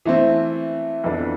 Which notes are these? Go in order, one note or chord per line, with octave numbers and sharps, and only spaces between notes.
E3 A3 C4
F2 E3 B3 D4 A4